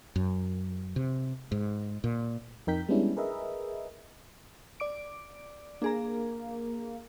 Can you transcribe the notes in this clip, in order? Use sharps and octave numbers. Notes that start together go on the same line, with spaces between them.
F#2
C3
G#2
A#2
F2 D#4 A#4 G5 G6 B6
G3 G#3 B3 C#4 D4 E4
G#4 A#4 B4 D#5 E5
D5 D6 D7
A#3 D4 G#4 A#5